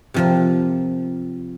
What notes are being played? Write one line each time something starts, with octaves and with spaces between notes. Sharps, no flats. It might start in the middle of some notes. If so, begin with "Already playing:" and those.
C3 F3 A#4